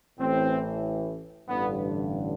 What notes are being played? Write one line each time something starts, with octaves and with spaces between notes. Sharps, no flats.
A1 A2 E3 C4
A1 G2 D3 B3